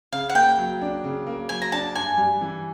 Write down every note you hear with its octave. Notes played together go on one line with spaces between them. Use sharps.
C#3 F5
F#5
A#3 G5
F#3
D4
C#3
A#3
F#3 G#5
A#5
D4 A5
G2 G#5
G3
E3